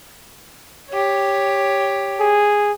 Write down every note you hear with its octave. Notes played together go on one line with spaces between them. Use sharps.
G4 C#5
G#4